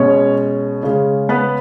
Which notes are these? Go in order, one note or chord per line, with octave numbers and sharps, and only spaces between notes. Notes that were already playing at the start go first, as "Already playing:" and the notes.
Already playing: B2 G#3 C#4 C#5
C#3 G#3 C#4
B3 B4